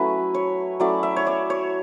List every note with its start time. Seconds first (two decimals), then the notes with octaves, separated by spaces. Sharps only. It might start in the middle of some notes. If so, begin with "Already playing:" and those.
Already playing: F#3 A3 C#4 E4 B4
0.34 C#5
0.80 F#3 A3 C#4 E4 D5
1.03 E5
1.16 C#5
1.27 D5
1.50 C#5